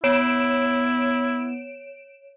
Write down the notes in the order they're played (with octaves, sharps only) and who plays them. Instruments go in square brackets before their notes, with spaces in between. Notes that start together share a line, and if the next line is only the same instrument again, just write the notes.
[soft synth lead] B3 [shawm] E4 [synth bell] C#5 D7 E7